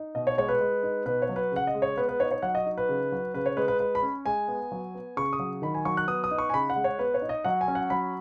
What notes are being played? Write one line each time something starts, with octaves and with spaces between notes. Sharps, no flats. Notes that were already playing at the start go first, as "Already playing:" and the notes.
Already playing: D#4
B2 D#5
C#5
G#3 C#5
B4
G#3
D#4
B2 B4
C#5
F#3
B4
C#3 F#5
D#5
G#3
C#5
B3 B4
B4
D#4 C#5
C#5
F#3 F#5
D#5
D#4
B4
C#3
F#3
C#3 B4
C#5
G#3 B4
B4
G#3 B4
B5
C#4
G#3 G#5
B3
F#3
B3
C#3 C#6
D#6
F#3
D#3 B5
G#5
F#3 C#6
F#6
B3 D#6
D#6
D#4
C#6
G#5
C#3 B5
F#5
G#3
C#5
B3 B4
C#5
D#4
D#5
F#3 F#5
G#5
C#4
F#5
F#3 B5